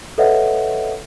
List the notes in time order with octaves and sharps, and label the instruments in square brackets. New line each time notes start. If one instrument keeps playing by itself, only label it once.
[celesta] A4 B4 C#5 D#5 E5 F#5